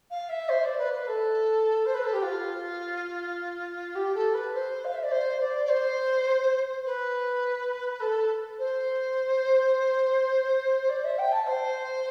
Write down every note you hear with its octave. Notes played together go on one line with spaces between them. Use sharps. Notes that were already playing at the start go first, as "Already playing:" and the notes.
F5
E5
C5
D5
B4
B4
A4
C5
B4
A4
G4
F4
G4
A4
B4
C5
F5
E5
D5
C5
D5
D5
C5
B4
A4
C5
D5
E5
G5
A5
C5